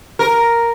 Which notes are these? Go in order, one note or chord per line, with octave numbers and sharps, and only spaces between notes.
A#4